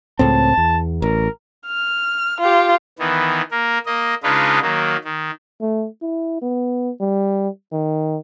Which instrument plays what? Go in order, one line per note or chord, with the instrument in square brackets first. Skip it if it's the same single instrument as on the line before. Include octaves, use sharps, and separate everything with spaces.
[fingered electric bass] C#2 A2 C4 [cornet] A5
[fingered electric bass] E2
[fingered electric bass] A1 [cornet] A#4
[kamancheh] F6
F4 G4
[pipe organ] D#3 E3 B3
A#3 A#4
A#3 D#5
C#3 G#3 D4 D#4 F4 B4
D#3 F#3 A#3
D#3
[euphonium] A3
E4
B3
G3
D#3